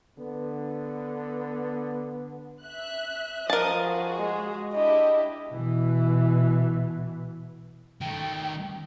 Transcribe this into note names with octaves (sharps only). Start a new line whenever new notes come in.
D3 B3
E5 F#6
F3 A#4 D#5 A5 D#6
F#4 G#4
G#3
D4 E4 G4 D#5
B2 E3
D#3 A3 G5